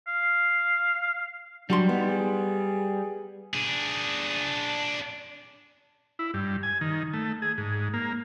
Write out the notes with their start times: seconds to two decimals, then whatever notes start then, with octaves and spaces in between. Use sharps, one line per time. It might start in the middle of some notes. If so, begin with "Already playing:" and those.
0.07 F5
1.70 F#3 G3 D4 F#4 C6
1.89 B3 D#4
2.08 G#4
3.54 D4 G#4
6.19 E4
6.34 G2
6.63 G#5
6.81 D#3
7.13 A3
7.42 G#4
7.58 G#2
7.93 A#3